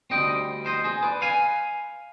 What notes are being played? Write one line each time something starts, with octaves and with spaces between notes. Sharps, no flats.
D2 D3 G3 C4 D#5 G5
C5 D#5
G#4 C5
B4 D5
F5 G#5